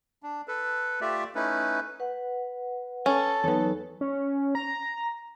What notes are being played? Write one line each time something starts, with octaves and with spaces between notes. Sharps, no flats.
D4
A4 B4
A3 F4 G4 D5 E5
A3 C#4 D#4 E4 B4
B4 F#5
C#4 A4
E2 F#3 B3 D#4 C#5
C#4
A#5